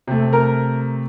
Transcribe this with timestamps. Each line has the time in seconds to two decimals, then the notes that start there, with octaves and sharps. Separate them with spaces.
0.07 C3 A3
0.33 A#4